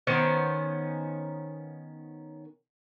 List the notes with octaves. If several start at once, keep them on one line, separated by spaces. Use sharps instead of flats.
D#3 B3 C#4 C5